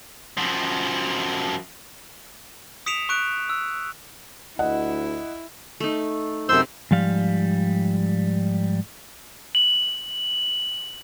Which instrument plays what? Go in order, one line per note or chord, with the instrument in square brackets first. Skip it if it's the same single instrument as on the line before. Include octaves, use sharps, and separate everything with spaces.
[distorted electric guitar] F#2 F3
[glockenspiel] D#6 B6 C#7 D7 E7 F7
C#6 F#6 D7
E6
[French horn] D2 [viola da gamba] E4 [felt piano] D#5 F#5
[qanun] A3 D#4
[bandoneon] F#2 C5 E6 [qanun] C3 C6
[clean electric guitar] G#2 F3 G3 F5
[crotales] F#7